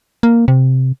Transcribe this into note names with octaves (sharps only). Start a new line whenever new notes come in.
A#3
C3